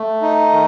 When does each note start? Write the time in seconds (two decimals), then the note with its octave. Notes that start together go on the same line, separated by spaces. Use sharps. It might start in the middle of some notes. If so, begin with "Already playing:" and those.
Already playing: A3
0.22 D#4
0.52 D#3